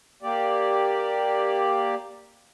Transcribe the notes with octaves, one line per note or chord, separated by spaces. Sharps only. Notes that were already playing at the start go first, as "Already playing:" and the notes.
A#3 G4 D5